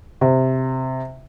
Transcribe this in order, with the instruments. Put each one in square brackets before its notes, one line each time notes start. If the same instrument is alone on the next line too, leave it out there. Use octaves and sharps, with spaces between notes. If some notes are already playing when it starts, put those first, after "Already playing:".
[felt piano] C3